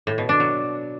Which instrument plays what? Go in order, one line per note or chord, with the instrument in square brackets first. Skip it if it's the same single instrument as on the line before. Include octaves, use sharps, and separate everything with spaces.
[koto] A2
B2
D4
F#3